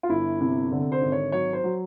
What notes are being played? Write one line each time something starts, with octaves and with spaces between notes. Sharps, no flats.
F4
G1 E4
C3
D3
C5
G#1
C#5
F#3 C#5
C5
F#3